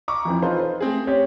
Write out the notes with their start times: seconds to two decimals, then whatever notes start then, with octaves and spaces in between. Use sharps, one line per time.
0.08 A#5 C#6 D6
0.25 F2 E3 C4
0.42 D#4 F4 A4 B4 C5
0.60 C5
0.80 A3 C4 G#4
1.07 C4 C#4 G4 C#5